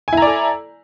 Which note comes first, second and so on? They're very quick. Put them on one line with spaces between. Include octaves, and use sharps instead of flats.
G#5 E4 A#5 D5 A4